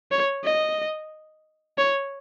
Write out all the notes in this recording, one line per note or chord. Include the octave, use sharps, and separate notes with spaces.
C#5
D#5
C#5